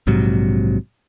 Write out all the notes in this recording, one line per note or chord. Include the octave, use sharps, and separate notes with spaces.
A#1 G#2 C3 F#3